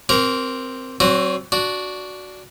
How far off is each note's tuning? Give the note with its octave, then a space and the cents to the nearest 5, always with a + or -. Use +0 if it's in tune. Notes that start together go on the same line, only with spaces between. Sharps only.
C4 +0 G4 -45 A#4 +10
F#3 +40 C4 +15 F#4 +0
D4 -10 F#4 +0